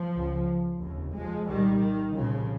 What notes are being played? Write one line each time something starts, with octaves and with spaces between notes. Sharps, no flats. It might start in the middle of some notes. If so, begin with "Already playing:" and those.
Already playing: F3
C#2 C#3
F1 D#2 C#3
F3 G#3
C2 A#2 D#3 G3
D#3
C2 A#2 C#3 F3